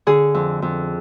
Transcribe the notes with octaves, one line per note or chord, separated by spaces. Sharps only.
D3 G#4
F2
F2